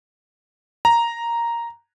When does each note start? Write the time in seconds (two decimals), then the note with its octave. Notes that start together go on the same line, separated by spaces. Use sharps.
0.85 A#5